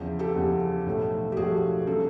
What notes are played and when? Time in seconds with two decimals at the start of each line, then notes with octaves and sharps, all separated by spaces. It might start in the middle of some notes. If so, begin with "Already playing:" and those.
Already playing: E2 C#3 F3
0.19 G4 A4
0.36 E2 C#3 F3
0.86 B1 A2 F3 A3
1.32 G4
1.36 B1 A2 F3 A3 F#4 G#4
1.87 C#3 F#3 A3 A4